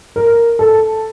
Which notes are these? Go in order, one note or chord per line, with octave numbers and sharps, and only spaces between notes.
A#4
A4